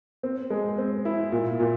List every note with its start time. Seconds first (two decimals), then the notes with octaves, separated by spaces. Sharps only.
0.23 C4
0.50 G#3
0.78 C4
1.05 E4
1.32 A#2
1.60 A#2